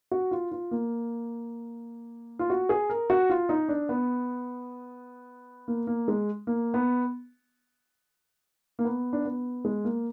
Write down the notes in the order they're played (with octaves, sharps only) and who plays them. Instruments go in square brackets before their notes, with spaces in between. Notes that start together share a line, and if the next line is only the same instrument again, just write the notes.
[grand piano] F#4
F4
F4
A#3
F4
F#4
G#4
A#4
F#4
F4
D#4
D4
B3
A#3
A#3
G#3
A#3
B3
A#3
B3
D4
B3
G#3
A#3